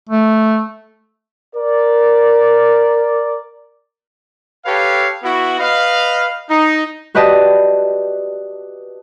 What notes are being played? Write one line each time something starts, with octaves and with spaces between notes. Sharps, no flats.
A3
A#4 D5
G4 A4 B4 C#5 F5
B3 E4 F#4
B4 D#5 F5
D#4
F#4 G4 B4 D5 D#5 A5